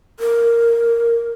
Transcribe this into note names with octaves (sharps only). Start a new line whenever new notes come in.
A#4